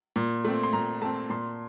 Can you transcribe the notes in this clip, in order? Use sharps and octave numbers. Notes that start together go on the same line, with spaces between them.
A#2
A3 C4
C6
A#2 A#5
A3 C4 A5
A#2 C6